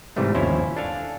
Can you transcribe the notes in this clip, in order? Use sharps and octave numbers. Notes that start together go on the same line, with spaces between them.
G#2 C3 E3 G3 A3 D4
G1 D#2 F3 C#4 E4 C5
D4 A4 F5 G#5